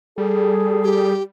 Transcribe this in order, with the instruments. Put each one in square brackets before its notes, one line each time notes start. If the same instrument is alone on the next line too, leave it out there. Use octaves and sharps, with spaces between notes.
[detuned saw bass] G3 [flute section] G#4 [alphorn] A4
[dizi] G4